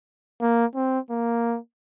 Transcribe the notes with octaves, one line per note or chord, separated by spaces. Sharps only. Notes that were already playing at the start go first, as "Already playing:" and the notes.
A#3
C4
A#3